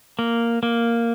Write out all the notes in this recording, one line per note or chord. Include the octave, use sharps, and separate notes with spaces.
A#3
A#3